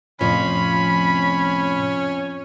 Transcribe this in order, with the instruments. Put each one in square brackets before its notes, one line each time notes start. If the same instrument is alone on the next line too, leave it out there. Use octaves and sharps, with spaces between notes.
[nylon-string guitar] F2 F3 [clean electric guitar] A2 C3 [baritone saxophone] C#4 [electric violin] B5